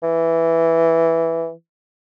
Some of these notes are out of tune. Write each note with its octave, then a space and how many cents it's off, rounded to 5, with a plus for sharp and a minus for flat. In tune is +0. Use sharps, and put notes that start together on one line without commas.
E3 +0